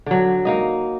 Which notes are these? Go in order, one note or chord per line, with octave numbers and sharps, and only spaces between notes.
D3 F#3
A#3 D#4 D#5